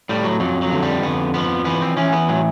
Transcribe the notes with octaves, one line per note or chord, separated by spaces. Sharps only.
A2 G3
F#3
F2 F#3
F#3
D3
G3
F2 B3
F3 B3
E3 B3
C4
E3 C#4
B3
A2 F#3